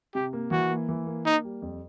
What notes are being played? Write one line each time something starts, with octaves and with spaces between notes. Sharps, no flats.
C3 G4
A#3
E3 F#4
A#3
E3
A#3
A#3 D#4
G3
F2